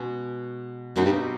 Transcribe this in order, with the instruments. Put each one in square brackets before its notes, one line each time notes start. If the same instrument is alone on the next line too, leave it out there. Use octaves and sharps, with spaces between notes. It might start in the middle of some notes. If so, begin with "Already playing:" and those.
Already playing: [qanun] B2 G#3 C#4 F#4
[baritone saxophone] F#2 [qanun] B2 G3 C4 D#4
[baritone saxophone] G2